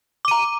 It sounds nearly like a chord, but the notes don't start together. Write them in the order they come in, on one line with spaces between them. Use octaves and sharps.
D6 D#7 A#5